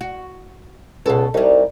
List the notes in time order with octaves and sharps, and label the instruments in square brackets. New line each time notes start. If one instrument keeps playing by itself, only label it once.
[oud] F#4
[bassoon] C#2 [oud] B2 A4
[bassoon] C2 [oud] G3 D#4